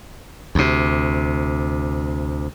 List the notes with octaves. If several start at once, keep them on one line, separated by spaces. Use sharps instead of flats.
D2 C3